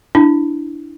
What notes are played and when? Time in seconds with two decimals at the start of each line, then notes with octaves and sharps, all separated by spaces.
0.15 D4 E4